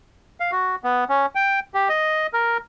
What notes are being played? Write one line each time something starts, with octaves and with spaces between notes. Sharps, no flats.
F5
F#4
B3
C#4
G5
G4
D#5
A#4